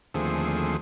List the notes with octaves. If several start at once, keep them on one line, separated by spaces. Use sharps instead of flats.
D#2 D3 F3 A3 C4 G#4